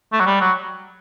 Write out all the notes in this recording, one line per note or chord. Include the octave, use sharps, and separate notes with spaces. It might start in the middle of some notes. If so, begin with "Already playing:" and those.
A3
F#3
G3
F#3